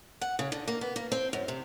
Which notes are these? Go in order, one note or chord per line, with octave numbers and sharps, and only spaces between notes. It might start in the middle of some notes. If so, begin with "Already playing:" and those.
F#5
C#3
D3
A#3
B3
A#3
C4
F#2
C3